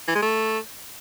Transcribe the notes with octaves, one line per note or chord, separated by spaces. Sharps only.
E3
G#3
A3